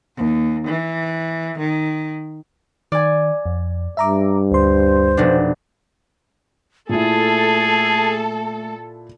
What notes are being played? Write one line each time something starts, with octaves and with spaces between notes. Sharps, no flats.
D#2
E3
D#3
D#3 D5 G#5
F2
G2 E5 A#5 D6
D2 C5 C6
F1 B2 D4
A#2 A3 E4 G#4 A4